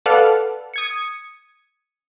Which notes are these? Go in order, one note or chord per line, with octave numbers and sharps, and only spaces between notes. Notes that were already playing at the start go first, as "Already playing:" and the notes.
A4 B4 D5 F5 F#5 F6
D#6 G#6 C#7